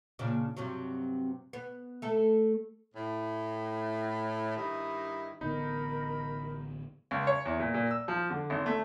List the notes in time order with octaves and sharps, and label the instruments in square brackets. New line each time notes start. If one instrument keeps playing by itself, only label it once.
[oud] A#2 C#3 D4
G2 C3 F#3
B3
A3 A4
[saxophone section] A2
G2 D#3 D#4 E4
[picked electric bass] A1 D3 B3 [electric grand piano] D#4 [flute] A#4 [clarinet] B5
[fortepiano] C#2
C#5
E2
A#2
A#2
E6
F3
D3
G#1
A3